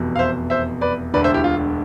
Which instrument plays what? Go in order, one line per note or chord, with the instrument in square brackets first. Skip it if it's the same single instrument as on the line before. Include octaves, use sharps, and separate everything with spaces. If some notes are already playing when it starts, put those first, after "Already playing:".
Already playing: [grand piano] F1 E2 B2
F5
C5 E5
C5 E5
B4 D5
E1 D2 D3 B4 D5
C5 E5
E4 G4
F4